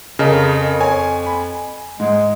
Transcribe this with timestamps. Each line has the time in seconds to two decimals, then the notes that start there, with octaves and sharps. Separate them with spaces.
0.19 F2 C#3 A#4 D#5 A5
0.81 C#5 G#5
1.26 B5
2.00 G#2 G#3